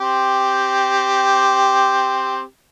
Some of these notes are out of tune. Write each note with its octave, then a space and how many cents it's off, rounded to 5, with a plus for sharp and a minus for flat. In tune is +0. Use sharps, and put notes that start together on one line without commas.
C4 +0 G4 +0